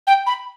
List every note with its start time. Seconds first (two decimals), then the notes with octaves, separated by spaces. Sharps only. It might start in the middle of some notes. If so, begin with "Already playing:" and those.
0.07 G5
0.27 B5